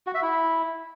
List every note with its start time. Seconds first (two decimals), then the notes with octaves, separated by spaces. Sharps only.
0.07 F#4
0.14 E5
0.22 E4